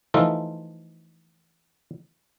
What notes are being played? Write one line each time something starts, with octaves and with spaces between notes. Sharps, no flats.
E3 F3 A3 D#4 F4 A4